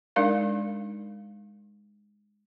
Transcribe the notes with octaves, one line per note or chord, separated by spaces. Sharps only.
G#3 D4 D#4 A#4 D5 F5